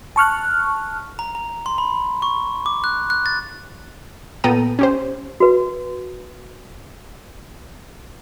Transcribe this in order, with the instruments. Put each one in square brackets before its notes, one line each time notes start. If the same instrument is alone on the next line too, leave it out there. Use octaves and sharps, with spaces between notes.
[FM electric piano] A5 C#6 F6 F#6
[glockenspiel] A#5
A#5
C6
B5
C#6
D6
F#6
F#6
A6
[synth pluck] A#2 B3 A4 G5 A#5 D#7
C#4 G4 C5
[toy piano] F#4 B4